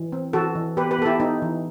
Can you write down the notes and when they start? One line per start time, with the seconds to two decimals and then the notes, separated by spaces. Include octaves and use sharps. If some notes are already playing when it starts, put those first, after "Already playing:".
Already playing: E3
0.12 C4
0.33 E3 F#4 A4
0.55 E3
0.77 B3 G4 B4
0.91 G4 B4
0.99 B3 A4
1.05 E4 G4
1.20 B3 D#4
1.42 E3